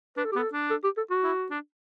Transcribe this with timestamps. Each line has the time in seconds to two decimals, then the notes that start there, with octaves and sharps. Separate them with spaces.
0.17 D4 B4
0.25 A4
0.32 G4
0.36 B3
0.39 A4
0.53 D4
0.71 A4
0.84 G4
0.97 A4
1.11 F#4
1.24 E4
1.50 D4